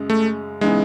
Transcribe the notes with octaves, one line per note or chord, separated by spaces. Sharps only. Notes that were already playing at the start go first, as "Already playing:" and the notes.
Already playing: F#2 C#3 G#3
A3
C#3 E3 G#3 B3 D#4